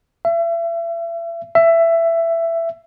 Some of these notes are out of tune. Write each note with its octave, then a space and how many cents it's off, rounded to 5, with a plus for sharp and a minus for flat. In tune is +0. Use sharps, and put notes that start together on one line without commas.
E5 +35
E5 +15